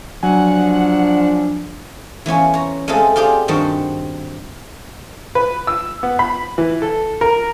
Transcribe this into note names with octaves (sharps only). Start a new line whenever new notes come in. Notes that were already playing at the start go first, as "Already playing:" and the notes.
F3 F#3 D4 F#5 G#5
E3 B3 C#4 F4
C#5 A#5
G#3 A3 C4 F4 G#4 A4
F4 G4 G#4 C5 D5
G2 D#3 C4 F#4 F#5 A5
B4
E6
B3
B5
E3
A4
A#4